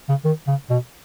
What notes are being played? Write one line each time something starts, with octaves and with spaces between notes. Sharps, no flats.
C#3
D#3
C#3
B2